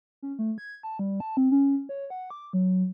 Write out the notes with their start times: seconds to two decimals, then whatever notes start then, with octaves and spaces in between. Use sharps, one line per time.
0.22 C#4
0.39 A3
0.58 G#6
0.83 A5
0.99 G3
1.20 A5
1.37 C4
1.52 C#4
1.89 C#5
2.10 F#5
2.31 D6
2.53 F#3